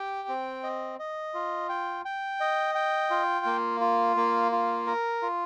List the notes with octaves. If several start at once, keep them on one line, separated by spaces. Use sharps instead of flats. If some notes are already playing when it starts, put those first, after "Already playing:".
Already playing: G4 G5
C4
D#5
D#5
F4
G5
G5
D#5
G5
F4
A#3
F4
A#3
F4
A#4
F4